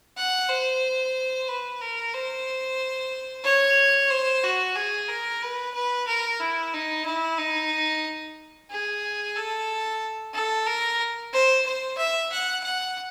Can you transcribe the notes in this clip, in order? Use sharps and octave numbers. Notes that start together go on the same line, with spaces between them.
F#5
C5
B4
A#4
C5
C#5
C5
F#4
G#4
A#4
B4
B4
A#4
E4
D#4
E4
D#4
G#4
A4
A4
A#4
C5
C5
E5
F#5
F#5